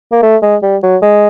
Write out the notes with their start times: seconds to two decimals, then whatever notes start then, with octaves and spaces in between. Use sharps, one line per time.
0.12 A#3
0.23 A3
0.42 G#3
0.63 G3
0.83 F#3
1.02 G#3